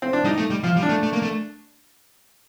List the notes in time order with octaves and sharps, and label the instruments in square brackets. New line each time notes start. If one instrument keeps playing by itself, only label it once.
[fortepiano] C4
D4
[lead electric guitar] G3 [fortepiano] D#4
[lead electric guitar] A3
G3
[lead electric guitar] F3 [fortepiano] F4
[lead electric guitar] G3
[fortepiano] D4
[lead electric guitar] A3
A3
A#3
A3